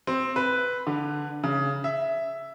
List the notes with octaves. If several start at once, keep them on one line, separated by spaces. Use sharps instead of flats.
C4
B4
D3
C#3
E5